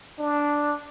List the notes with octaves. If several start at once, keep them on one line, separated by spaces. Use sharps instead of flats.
D4